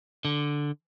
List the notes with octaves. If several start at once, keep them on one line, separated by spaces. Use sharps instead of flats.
D3